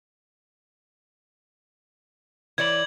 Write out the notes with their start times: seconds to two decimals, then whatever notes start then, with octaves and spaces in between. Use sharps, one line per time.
2.58 E3 C#5 D5 G#6 F#7